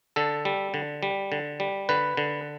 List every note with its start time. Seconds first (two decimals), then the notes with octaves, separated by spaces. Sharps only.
0.16 D3 A4
0.45 G3
0.74 D3
1.03 G3
1.32 D3
1.60 G3
1.89 D3 B4
2.17 D3